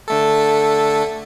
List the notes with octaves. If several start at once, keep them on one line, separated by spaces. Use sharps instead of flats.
D3 A3 A4